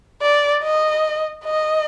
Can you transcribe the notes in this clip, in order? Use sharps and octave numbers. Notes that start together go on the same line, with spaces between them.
D5
D#5
D#5